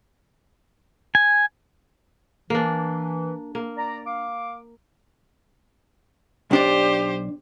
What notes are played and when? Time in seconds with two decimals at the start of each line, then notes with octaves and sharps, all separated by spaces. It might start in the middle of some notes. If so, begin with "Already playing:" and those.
1.15 G#5
2.50 E3 A#3 D4
3.55 A#3
3.77 D5 A#5
4.06 F5 D6
6.51 B1 D4 G4 C5 D5